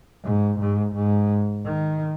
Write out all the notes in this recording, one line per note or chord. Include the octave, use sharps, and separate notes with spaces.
G#2
G#2
G#2
D#3